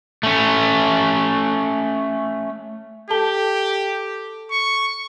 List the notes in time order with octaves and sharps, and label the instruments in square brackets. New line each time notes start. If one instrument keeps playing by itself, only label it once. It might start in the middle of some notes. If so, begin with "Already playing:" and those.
[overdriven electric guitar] A3 C#4
[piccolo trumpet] G4 [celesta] A4 A5 G7
[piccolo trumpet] C#6